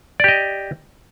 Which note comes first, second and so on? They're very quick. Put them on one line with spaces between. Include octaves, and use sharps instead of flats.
D5 G4 D#5